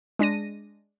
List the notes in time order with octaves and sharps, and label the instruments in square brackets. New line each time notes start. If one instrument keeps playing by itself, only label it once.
[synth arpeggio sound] G#3 D4 A#6 D#7